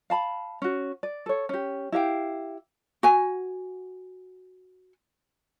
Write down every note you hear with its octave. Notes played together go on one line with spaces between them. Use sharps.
F5 A5 B5
C#4 F#4
D5
A4 C#5
C#4 G4
E4 G4 F5 G5
F#4 G#5